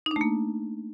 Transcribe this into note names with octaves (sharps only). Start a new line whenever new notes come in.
A3 A#3 D4 D#4